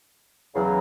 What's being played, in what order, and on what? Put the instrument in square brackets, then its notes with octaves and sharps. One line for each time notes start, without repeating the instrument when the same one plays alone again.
[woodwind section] E2 C#3 F#3